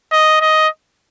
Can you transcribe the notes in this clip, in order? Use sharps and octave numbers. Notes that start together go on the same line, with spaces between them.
D#5
D#5